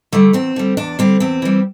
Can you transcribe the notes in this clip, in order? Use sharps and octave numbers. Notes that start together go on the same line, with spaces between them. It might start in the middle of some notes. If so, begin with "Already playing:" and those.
D3 G3 A3
E2 C4
D3 G3
E2 D4
D3 G3 C4
E2 C4
E3 G3